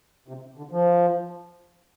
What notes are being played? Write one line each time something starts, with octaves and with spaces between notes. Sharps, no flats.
C3
D3
F3